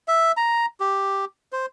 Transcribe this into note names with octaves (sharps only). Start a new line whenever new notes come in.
E5
A#5
G4
C5